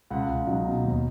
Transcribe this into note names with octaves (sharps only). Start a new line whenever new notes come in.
C#2 F#5
C#2
F#3 D#4
B2
D#2